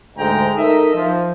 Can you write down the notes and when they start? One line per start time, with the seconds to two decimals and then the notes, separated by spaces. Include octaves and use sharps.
0.17 D2 G#2 G#3 G5 A#5
0.55 D#4 A4 A#4 D#5 E5
0.95 F3